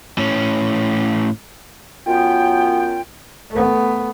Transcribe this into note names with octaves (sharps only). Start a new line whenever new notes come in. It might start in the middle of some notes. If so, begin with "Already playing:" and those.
A2 C#4
F#2 B3 F4 G5
A3 B3